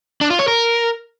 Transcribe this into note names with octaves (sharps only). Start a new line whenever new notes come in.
D4
F4
C#5
A#4